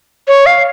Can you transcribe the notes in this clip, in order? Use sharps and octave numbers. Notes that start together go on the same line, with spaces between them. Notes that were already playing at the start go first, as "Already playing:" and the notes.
C#5
F5